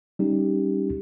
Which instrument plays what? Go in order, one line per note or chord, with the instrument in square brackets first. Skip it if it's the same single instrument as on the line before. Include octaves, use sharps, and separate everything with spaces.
[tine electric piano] G3 C#4 D#4 G4